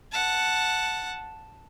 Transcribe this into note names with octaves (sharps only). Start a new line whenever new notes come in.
F#5 A5